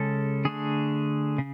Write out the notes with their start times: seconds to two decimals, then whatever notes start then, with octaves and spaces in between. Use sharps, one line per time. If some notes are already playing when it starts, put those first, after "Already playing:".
Already playing: C#3 G#3 C#4 A4
0.45 D3 A3 D4 G#4
1.38 C#3